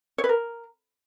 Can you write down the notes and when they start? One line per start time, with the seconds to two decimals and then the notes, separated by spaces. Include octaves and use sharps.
0.18 C#5
0.24 B4
0.29 A#4